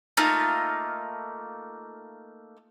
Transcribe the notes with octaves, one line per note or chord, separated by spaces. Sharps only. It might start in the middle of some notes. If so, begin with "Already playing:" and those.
A3 A#3 D#4 F4